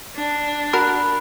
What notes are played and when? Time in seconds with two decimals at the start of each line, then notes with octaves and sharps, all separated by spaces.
0.16 D4
0.73 F#4 A#4 B5 F#6